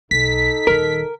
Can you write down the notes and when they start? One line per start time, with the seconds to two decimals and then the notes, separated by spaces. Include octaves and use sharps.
0.11 B1 D#4 A4 B6
0.67 D#1 D#3 A#4